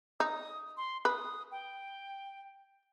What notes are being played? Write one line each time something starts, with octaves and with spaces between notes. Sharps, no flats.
D#4 D#6
C6
B4 D#6
G5